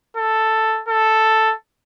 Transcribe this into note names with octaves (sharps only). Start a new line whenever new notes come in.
A4
A4